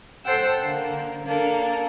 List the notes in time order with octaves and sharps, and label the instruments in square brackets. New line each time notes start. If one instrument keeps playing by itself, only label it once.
[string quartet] A4 C5 F#5 G5 E6
D3 A#3
A#3 D4 A4